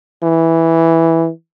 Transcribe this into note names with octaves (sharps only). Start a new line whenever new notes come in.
E3